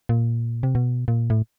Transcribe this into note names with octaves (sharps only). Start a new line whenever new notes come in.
A#2
C3
B2
A#2
A2